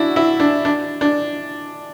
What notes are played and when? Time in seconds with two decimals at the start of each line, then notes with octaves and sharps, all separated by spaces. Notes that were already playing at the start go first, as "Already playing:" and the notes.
Already playing: D4 E4 F#4
0.16 E4
0.40 D4
0.65 D4
1.01 D4